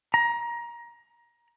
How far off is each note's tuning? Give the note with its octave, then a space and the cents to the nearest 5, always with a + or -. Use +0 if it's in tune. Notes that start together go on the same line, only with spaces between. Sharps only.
A#5 +20